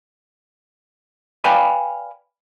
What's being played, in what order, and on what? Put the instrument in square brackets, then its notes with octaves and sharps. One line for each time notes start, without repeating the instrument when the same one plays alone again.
[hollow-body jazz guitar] B4 D5 F5 G5 G#5 B5